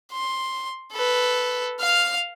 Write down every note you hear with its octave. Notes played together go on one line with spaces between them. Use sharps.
C6
A4 B4
F5 F6